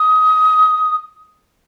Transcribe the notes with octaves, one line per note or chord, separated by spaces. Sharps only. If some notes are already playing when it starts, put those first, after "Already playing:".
Already playing: D#6